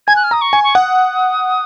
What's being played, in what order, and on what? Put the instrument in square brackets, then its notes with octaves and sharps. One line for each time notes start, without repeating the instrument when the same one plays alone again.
[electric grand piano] G#5 [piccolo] G#6
[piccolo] F#6
F6
[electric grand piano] A#5 [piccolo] D#6
[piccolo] C#6
[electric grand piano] G#5
[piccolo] C#6
[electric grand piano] F#5 [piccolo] D#6